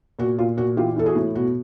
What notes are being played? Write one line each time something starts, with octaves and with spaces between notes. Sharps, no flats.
A#2 F#4
A#2 F4
A#2 F#4
E3 F4 G4
E3 A4
F#4 G#4
A2
B2 F#4